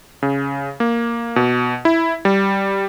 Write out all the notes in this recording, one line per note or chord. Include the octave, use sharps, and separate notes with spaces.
C#3
A#3
B2
E4
G3